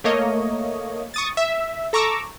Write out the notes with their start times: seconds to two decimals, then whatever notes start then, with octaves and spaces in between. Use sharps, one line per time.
0.04 A3 A#3 C#5 D#5
1.14 C#6 D#6 A6
1.37 E5
1.93 A4 A#5 C#6 D6 E6